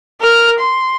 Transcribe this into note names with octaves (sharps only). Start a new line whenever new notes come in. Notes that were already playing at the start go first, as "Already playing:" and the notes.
A#4 F6
C6